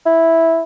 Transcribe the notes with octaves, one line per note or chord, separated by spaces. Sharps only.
E4